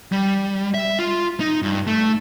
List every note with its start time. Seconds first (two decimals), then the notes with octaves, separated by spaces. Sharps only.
0.12 G3
0.74 E5
0.99 F4
1.40 D#4
1.62 G2
1.87 A3